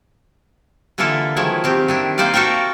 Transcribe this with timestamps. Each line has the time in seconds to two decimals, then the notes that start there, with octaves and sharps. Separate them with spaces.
0.98 D3 E3 A#3 E4 F4 A4
1.36 D#3 F3 F#3 G#3 E4
1.64 D#3 C4 G4
1.88 D#3 D4 E4
2.18 A#3 D#4 C5 D5 D#5 F5
2.34 F#4 A4 A#4 E5 G5